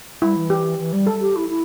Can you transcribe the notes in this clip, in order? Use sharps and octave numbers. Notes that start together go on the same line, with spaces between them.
G3 E4
E3
G4
E3
G3
A4
G4
E4
E4